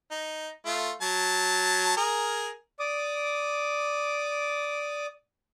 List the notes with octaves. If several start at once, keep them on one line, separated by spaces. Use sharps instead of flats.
D#4
A3 F4
F#3 A5
G#4 A#4
D5 D6 D#6